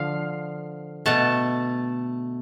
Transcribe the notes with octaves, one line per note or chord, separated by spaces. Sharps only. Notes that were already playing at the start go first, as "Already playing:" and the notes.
Already playing: D3 F3 F5
B2 A3 F#5 A5